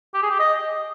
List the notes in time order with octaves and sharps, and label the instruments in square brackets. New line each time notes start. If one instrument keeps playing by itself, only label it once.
[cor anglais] G4
G#4
G4
D#5